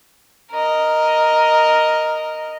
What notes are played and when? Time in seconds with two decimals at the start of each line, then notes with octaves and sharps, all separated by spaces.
0.52 A#4 D#5